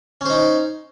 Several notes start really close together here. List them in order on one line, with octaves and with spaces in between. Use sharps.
C#4 C5 D#4